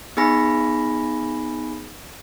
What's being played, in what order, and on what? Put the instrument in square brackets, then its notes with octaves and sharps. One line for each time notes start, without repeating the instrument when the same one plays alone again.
[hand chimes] B3 D#4 G#4 G#5 B5 A#6